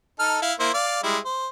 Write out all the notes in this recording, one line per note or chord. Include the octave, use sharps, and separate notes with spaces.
D#4 A4 F6
E4 F5
A#3 E4 C5
D5 F5
G3 G#3 E4
C5